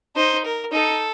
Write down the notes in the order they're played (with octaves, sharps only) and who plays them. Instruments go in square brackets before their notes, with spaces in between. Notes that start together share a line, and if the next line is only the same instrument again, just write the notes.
[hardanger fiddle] D#4 [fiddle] C5
[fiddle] A#4
[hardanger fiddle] D#4 [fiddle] A4